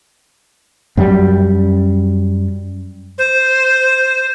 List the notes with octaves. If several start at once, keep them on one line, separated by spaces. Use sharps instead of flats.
F#2 F#3 G3
C5